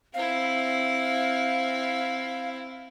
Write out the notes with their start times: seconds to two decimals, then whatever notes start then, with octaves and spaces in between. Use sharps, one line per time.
0.14 C4 E4 F5